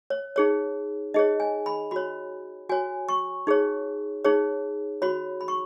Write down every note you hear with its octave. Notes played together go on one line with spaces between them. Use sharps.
C#5
D#4 G#4 C#5
D#4 G#4 C#5 D#5
G#5
B5
F#4 C#5 B5
F#4 C#5 G#5
C#6
D#4 G#4 C#5
D#4 G#4 C#5
F#4 C#5 B5
B5
C#6